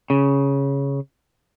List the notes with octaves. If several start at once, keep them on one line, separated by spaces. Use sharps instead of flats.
C#3